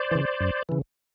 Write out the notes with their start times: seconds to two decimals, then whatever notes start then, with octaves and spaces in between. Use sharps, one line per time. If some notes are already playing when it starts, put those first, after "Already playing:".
Already playing: C5 D5
0.11 C#3 E3
0.41 F#2
0.69 C#3 E3